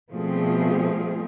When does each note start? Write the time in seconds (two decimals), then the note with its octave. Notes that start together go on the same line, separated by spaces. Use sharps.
0.13 B2 F3 G3 A3 C4 G#4